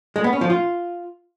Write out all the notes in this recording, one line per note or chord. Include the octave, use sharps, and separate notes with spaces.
G#3
B3
C#4
F3
F4